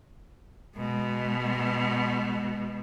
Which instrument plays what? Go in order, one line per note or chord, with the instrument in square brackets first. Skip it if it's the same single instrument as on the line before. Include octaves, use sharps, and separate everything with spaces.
[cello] B2 G#3